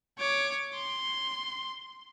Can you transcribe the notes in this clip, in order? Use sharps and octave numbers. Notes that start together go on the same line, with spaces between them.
C#5 D6
C6